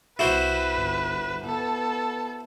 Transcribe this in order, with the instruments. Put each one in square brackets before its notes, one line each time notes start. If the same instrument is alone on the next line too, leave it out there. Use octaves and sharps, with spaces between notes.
[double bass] C2 [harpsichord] E4 F#4 C5 [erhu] B4
[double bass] G1
[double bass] B3 [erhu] A4